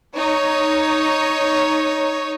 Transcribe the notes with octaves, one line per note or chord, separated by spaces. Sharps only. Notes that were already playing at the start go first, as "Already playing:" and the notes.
D#4 C#5